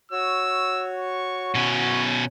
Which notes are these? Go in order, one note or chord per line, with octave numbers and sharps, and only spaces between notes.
F#4 C#5 E6
C#6
B2 C#4 E4